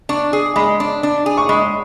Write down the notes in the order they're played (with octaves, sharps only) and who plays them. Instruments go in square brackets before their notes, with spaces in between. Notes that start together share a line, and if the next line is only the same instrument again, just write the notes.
[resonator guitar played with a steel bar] D4 [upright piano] C#6
[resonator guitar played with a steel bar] G#4
[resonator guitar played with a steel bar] G#3 [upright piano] B5
[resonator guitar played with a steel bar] D4
D4
G#4
[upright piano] C#6
[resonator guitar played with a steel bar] G#3 [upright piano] B5